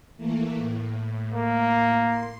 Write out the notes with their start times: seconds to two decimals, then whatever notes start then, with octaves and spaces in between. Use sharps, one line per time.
0.17 E3 A3 A#3
0.55 A2
1.33 A#3
2.06 C6